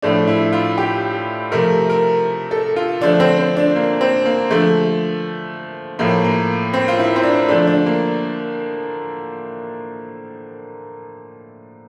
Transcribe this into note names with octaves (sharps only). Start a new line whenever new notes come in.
A2 F3 A3 D4
E4
F4
G4
C3 F3 A3 A#4
A#4
A4
F4
D3 F3 A3 D4
C4
C4
D4
A#3
C4
A#3
D3 F3 A3
A2 F3 A3 A#3
A#3
C4
F4
E4
C4
D4
D3 F3 A3 D4
D4
A#3